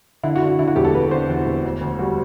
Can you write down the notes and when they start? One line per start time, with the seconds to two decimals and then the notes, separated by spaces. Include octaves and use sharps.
0.24 D3 E4
0.36 F#4
0.42 D3
0.47 F#4
0.59 D3 E4
0.68 F#4
0.76 E1 G4
0.85 A4
0.95 E1 B4
1.11 D3 C5
1.29 E2
1.46 E1
1.64 D2
1.81 D2
1.99 G3 F#4